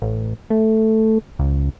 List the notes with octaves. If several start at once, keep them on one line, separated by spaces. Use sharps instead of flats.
A1
A3
C#2